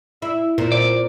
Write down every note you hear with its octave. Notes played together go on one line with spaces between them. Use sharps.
E4 E5
A#2 C4 A#4
D5